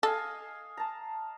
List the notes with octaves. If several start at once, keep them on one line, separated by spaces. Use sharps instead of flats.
A4 D#5 F5 G#5
A5 A#5